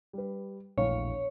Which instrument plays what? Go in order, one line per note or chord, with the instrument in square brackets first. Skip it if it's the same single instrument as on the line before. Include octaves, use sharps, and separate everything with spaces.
[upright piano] G3 B4
[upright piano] E1 A2 F5 [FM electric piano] A#1 [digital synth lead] C#5